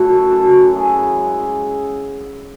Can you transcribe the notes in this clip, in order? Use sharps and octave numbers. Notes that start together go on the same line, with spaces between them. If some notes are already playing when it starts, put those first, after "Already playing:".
Already playing: A3 E4 F#4 A4 C#5
F#2
F#2 F#4 A4
F#2
B3 E4 G#4
C#3
G#3
C#3